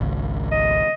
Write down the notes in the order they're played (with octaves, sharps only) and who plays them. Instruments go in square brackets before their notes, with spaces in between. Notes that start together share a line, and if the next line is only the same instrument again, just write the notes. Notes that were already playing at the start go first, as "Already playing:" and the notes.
[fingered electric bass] G#1 C#2
[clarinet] D#5